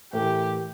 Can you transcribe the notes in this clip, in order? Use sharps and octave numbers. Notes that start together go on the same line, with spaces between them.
A2 E3 A3 E4 G4 A#4